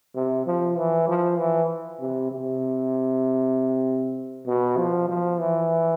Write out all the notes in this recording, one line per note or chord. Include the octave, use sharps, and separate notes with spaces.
C3
F3
E3
F3
E3
C3
C3
B2
F3
F3
E3